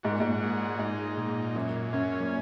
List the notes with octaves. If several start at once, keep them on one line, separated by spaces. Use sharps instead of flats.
G#2 F#4
A#2
G#2
G#3
G#2 D#4
A#2
F#2 F#3
F#2 C#4
A#2